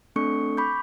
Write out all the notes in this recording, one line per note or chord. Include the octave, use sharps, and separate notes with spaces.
A3 C4 D4 A4 C#6 C#7
B5 C#6 D6 G6